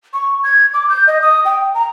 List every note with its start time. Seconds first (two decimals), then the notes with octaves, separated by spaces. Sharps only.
0.13 C#6
0.44 G#6
0.74 D6
0.90 G6
1.07 D#5
1.22 D#6
1.45 G5
1.75 A#5